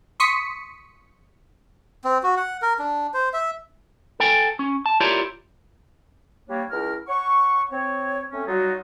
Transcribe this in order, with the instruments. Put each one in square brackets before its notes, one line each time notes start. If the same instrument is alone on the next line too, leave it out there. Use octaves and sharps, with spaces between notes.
[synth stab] C6 C#6 D#6 B6 C#7
[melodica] C4
F#4
F#5
A#4
D4
C5
E5
[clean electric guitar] A4 G5 G#5
C#4
A5
E4 F4 G4 A#4 C#5 D5
[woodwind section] G3 A#3 D4 C#5
C#2 E4 A#4 F6
C#5 F#5 C#6
C4 C#5
A3 C4 C#4
F#3 G3 D#4 F4 F#4